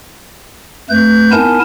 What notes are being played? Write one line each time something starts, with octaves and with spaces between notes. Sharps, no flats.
F2 A3 B4 G6
B3 D#4 E4 A#4 G#5 A5